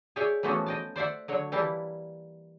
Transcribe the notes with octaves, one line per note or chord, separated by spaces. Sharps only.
G#4 C#5 D5 E5 G5
E3 F3 A3 B3 C#4 F#4
D#5 G5 A5
C5 D5 E5 F#5
D3 F#3 C#5
E3 G3 A#3 E4 A5